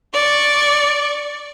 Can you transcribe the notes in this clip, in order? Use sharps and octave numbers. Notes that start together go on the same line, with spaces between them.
D5 C#6